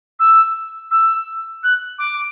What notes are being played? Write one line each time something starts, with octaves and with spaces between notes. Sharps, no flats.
E6
E6
F#6
D6